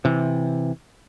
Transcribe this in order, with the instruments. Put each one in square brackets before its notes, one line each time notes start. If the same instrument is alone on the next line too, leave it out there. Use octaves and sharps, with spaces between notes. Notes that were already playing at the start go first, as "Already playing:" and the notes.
[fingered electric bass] C3 E3